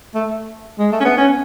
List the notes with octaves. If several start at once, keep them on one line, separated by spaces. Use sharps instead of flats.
A3
G#3
A3
C#4
B3
C#4